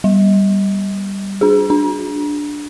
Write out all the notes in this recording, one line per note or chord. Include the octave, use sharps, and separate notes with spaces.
G3
D4 G#4
D4